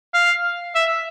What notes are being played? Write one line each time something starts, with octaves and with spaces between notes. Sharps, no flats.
F5
E5